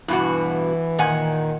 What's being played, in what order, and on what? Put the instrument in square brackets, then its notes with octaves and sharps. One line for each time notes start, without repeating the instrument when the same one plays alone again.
[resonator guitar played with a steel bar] G2 B2 F#4 [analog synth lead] E3
[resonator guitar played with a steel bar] A#2 F#5 G#5 [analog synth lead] D#3